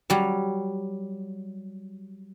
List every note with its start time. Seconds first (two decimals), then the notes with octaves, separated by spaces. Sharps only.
0.10 F#3 G3